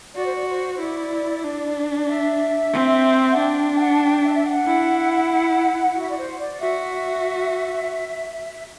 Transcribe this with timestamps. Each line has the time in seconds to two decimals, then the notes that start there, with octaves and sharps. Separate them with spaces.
0.15 F#4 D5
0.25 C5
0.34 D5
0.47 C5
0.73 C5
0.80 E4 D5
1.44 D4
2.08 E5
2.73 C4
3.31 F#5
3.37 D4 G5
3.76 G5
3.80 F#5
3.92 A5
4.03 G5
4.24 E5
4.34 E5
4.45 F#5
4.67 E4
5.91 F#5
5.95 F#4 E5
6.08 D5
6.17 C5
6.38 D5
6.60 F#4 E5